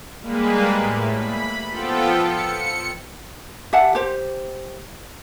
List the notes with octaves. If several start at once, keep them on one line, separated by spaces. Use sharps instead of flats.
G3 G#3 A#3 B4
A2
B5
F3 B3 F4 A4 G5
C#7
G4 E5 F#5 A5
G4 C5